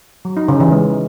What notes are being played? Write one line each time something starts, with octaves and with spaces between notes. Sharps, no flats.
F#3
D#4
C#3
E3
G#3